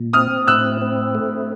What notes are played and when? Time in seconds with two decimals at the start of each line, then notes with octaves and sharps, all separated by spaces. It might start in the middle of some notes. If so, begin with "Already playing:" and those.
Already playing: A#2
0.13 C4 D#6 F6
0.47 A2 E6 F#6
0.82 C4
1.15 A3